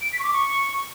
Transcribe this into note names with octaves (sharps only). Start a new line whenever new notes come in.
D7
B6
C#6
D6
C#6